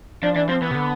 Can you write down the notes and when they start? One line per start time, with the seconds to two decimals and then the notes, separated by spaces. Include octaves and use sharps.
0.23 F3 D4
0.36 E3 D4
0.49 F3 C4
0.62 E3 B3
0.71 C3
0.75 D3